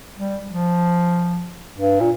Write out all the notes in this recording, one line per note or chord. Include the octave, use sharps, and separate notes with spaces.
G3
F3
G2
A#2